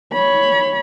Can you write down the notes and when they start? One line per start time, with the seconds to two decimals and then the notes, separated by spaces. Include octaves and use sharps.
0.13 C#5 B5